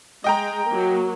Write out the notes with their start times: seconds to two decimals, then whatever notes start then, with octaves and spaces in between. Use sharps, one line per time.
0.24 G#3 D#5 G5 A#5
0.68 F#3 A#3